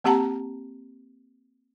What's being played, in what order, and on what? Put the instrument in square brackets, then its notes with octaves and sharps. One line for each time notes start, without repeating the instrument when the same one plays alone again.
[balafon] A#3 C4 G4 F#5 A5 A#5